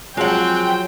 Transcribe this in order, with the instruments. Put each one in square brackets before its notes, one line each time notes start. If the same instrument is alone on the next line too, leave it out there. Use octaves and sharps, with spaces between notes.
[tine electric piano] F3 F#3 [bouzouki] G#3 F#5 [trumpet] C4 [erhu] G5